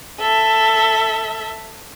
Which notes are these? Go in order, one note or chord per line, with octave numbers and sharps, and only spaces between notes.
A4 E5